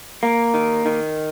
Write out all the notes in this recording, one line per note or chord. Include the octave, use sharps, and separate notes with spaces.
A#3
D#3
D#3